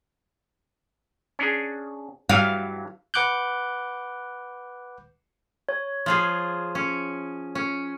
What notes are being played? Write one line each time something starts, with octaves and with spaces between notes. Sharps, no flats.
C#4 D4 G#4
G2 E3 F#3 F5
B4 F#5 D6 F#6 G6
C#5
F3 F4 G#4
C#4
C#4